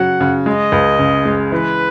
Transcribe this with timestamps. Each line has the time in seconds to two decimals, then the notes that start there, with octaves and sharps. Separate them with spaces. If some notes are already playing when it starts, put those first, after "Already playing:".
Already playing: C#3 F#3 F#5
0.21 C#3
0.46 G#3 D#5
0.72 C#2
0.99 C#3
1.25 G#3
1.52 E3 B4